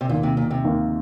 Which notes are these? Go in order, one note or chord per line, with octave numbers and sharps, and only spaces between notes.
C3
D#2 A#2 D#3 A#3
C3
A#2
C3
D#2 D#3 A#3